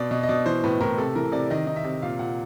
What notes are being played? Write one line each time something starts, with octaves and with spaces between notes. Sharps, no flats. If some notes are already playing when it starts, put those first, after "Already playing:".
Already playing: B2 D5
B2 D#5
D#5
B2 D5
E3 C5
A2 B4
A2 A#4
C3 A4
E3 A#4
C3 D5
D#3 D#5
D#3 D#5
E5
C3
A#2 F5
A#2 F#5